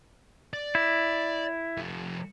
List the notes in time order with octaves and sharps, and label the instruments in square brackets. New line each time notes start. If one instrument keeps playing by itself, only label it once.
[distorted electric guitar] D5
[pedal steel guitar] E4
[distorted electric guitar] F3 A3